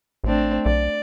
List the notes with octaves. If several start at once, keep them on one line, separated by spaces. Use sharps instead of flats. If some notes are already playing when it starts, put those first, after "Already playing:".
A1 A3 C4 D4
B1 D5